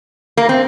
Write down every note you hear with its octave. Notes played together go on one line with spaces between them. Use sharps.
A#3
C4